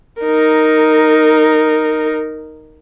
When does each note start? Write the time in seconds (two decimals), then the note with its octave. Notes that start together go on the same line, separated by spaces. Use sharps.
0.21 D#4 A#4